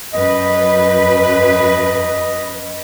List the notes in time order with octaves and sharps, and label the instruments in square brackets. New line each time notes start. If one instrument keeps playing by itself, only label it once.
[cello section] F#2 B4 [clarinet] D#5